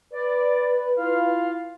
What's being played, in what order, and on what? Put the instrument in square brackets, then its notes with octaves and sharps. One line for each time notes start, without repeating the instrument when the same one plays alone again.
[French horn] B4 [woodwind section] D5
[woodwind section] E4 F4 F5